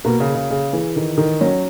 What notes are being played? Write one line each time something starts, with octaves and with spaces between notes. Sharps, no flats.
B2 A#3
C#3
G#4
C#3
C#3 G#4
E3 G#4
D#3
D#3
F#3 C#4